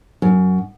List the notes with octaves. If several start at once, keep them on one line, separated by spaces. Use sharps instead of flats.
F#2